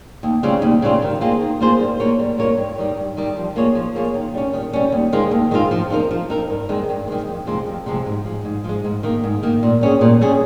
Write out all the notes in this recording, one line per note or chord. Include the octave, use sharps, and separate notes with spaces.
D#2
C#3 G3 C4 F4
D#2
C#3 G3 C4 F4
D#3
A#3 F4 G#4 C5
D#3
A#3 F4 G#4 C5
G3
A#3 F4 A#4 C#5
G3
A#3 F4 A#4 C#5
G2
D#3 G3
G2
D#3 G3
F3
A#3 F4 G#4 C#5
F3
A#3 F4 G#4 C#5
D#3
G3 C#4
D#3
G3 C#4
D#2
D#3 G#3 C4 F4
D#2
D#3 G#3 C4 F4
F3
C4 D#4 A#4
F3
C4 D#4 A#4
G2
D#3 G#3 C4
G2
D#3 G#3 C4
F2
C3 F3 G#3 C4
F2
C3 F3 G#3 C4
G#2
F3 G#3
G#2
F3 G#3
G#2
D#3 A#3
G#2
D#3 A#3
A#2
G3 C#4 G#4
A#2
G3 C#4 G#4